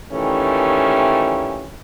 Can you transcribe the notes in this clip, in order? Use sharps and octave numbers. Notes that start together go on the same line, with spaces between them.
A#2 D#3 E3 A3 C#4 G4